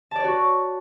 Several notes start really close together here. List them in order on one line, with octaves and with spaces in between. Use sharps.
A5 D5 C#5 F#4